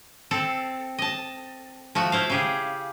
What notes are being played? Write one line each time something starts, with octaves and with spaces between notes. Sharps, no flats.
C4 A4
D#5 A5
F3 A3 F#4
E4 C5 F5
C#3 G4 G#4